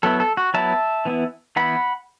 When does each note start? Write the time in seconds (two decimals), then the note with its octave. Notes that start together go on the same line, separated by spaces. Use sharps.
0.03 F#3 B3 E4 A4
0.20 A4
0.37 F#4
0.54 F#3 B3 E4 E5 A5
1.05 E3 B3 E4
1.56 E3 B3 E4 F#5 B5